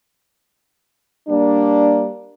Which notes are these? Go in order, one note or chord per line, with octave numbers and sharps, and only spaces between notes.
G3 A#3 D4